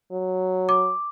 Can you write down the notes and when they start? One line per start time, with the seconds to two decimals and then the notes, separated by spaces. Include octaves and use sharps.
0.12 F#3
0.69 D6